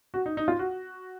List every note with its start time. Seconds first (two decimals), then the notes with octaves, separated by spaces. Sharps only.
0.14 F#4
0.26 D#4
0.37 D#4
0.48 F4
0.59 F#4